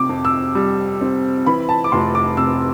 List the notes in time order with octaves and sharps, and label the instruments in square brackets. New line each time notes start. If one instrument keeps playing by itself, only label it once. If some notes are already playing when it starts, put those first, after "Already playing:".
Already playing: [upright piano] C3 D6
F2
E6
G3
C4
E3 B5
A5
D6
F1 C6
D6
C3 E6